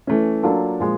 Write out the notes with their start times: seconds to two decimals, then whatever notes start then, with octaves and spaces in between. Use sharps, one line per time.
0.07 E3 A3 C#4
0.43 F#3 A#3 D4 F4 A4
0.80 A#2 F3 G#3